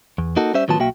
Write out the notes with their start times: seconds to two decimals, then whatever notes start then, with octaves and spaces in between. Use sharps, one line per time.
0.18 E2
0.37 A#3 D#4 F#4 A4
0.54 G3 C#4 C5 E5
0.68 A2 D#3 F#3 B3 F4 A5
0.80 B1 A#3 F#4 E5 G5